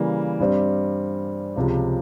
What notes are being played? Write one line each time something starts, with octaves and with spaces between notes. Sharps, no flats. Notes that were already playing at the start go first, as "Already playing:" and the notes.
Already playing: C#3 E3 G3 A#3
G2 G3 C4
C#2 C3 F3